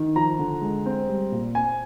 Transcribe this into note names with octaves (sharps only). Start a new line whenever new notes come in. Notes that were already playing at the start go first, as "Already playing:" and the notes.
Already playing: D#3
F3 A#5
D3
G#3
C4
G3
A#2
C4 G#5